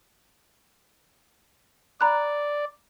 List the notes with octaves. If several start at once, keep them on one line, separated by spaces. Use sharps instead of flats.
D5 A#5 B5 F#6